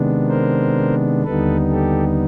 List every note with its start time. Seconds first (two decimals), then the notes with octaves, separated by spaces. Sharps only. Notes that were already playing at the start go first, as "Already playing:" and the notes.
Already playing: C3 D#3 G#3 B3 D4
0.28 A#4 C5
1.24 D#2 D3 G3 B3 D#4 A4 B4
1.71 G4 A4